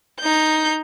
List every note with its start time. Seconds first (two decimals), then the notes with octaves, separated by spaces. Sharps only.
0.20 D#4 G6